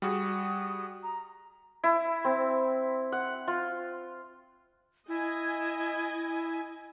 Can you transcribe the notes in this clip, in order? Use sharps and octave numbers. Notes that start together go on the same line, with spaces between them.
G3 F#4 G#4 D#6
A#5
E4
C4
F#5
F4
E4 D#5 G#5